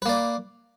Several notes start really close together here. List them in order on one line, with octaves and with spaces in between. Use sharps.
B4 A#3 D5